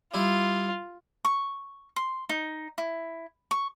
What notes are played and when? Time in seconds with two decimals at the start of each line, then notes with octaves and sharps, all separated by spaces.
0.14 G3 E4 F4
1.25 C#6
1.96 C6
2.29 D#4
2.78 E4
3.51 C#6